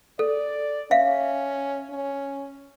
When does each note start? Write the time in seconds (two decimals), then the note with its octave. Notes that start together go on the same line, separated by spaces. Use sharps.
0.19 A4 D5
0.91 C#4 E5 F5
1.90 C#4